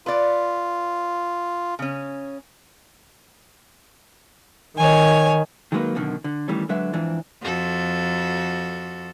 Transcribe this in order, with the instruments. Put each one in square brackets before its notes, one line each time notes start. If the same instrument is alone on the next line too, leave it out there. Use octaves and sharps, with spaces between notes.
[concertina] F4 [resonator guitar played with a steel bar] B4 D5
[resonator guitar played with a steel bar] C#3 C#4
[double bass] D#3 [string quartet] C#5 G#5
[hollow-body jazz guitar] D#3 F#3 G#3 A#3 D#4 B4
F#2 B2 D3 D#3
D3
D#3 E3 G3 A3 C#4
D3 F#3 G#3 B4 E5
F2 G#2 E3 D4
[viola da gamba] F2 F#4 A4